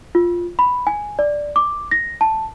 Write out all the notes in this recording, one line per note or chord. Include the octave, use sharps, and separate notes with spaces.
F4
B5
G#5
D5
D6
A#6
A5